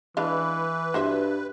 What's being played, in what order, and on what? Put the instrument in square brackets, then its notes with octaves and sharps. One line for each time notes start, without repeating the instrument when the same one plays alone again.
[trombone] E3 [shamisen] G#3 D4 F5 [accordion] B4
[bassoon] G2 [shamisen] F#4 C5 E5